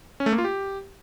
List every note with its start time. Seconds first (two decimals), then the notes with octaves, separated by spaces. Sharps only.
0.20 C#4
0.26 A3
0.32 A#3
0.38 F4
0.44 G4